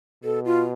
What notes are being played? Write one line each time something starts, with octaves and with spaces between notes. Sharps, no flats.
B2 A4
F4